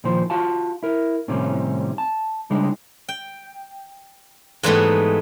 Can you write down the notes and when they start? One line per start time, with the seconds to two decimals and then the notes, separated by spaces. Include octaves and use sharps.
0.04 A#2 D#3 F3 C5
0.30 F4 F#4 F5 A5
0.83 E4 A#4
1.28 A2 C3 D#3 G3 C4 C#4
1.98 A5
2.50 C#3 G3 G#3 D4 D#4
3.09 G5
4.63 G#2 E3 G3 A3 B3 D#4